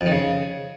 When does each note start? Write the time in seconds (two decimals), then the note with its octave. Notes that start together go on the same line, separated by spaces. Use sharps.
0.01 F2
0.06 D#3
0.11 C#3